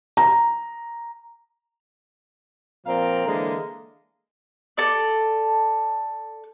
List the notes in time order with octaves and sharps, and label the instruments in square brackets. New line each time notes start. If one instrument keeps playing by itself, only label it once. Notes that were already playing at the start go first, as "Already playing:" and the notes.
[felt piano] A#5
[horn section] A#2 F3 C4 F5 A#5
D3 E3 G#3 A#3
[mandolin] A4 D5